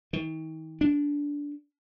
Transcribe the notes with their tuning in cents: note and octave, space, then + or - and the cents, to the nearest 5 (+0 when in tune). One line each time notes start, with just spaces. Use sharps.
D#3 +40
D4 -15